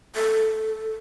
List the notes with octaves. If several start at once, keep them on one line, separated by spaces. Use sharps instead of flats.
A4